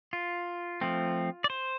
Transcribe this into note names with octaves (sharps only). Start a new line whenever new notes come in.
F4
F3 A3 C4
D5
C5